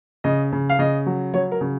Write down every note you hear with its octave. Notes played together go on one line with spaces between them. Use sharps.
C#3 D#5
C#3
F5
C#3 D#5
F#3
F#3 C#5
A#4
C#3